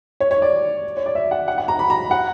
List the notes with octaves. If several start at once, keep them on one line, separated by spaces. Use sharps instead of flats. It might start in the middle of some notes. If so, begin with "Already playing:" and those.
C#5
C#5
D5
C#5
D5
E5
F#5
F#5
F#5
A#5
B5
A#5
F#5